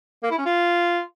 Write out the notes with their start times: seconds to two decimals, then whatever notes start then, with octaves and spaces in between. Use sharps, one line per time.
0.23 A#3
0.31 E4
0.38 C#4
0.46 F4